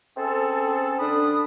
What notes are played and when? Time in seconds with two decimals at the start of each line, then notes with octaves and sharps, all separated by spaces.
0.17 C4 C#4 G#4 A4
0.99 D3 D4 B5 D#6